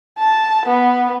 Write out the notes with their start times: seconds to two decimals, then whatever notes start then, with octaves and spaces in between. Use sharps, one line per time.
0.19 A5
0.66 B3